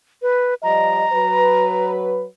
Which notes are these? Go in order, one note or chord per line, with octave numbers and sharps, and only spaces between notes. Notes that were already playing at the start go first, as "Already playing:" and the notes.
B4
F3 G3 D#5 A#5
F#3 B4